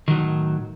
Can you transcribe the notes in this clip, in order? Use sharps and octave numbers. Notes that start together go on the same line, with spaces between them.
A2 D#3 F#3